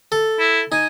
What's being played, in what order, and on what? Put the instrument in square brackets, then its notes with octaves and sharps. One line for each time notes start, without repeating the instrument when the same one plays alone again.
[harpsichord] A4
[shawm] E4
[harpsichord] D#4 [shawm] G#5